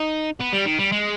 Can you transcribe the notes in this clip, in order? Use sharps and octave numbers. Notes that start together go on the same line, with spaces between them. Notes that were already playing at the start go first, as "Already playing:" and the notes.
Already playing: D#4
B3
G3
D#3
G3
G#3